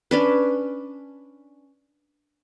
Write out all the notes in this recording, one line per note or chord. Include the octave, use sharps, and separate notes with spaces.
C#4 D4 B4